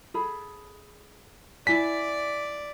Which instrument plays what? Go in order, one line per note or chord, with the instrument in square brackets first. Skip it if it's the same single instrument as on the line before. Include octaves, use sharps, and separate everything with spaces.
[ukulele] G#4 A4 B5
[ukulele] E4 G#5 [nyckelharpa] D5 [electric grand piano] B6